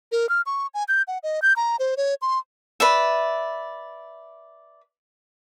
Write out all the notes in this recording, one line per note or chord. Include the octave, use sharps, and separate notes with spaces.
A#4
F6
C#6
G#5
G6
F#5
D#5
G6
A#5
C5
C#5
C6
B4 D5 E5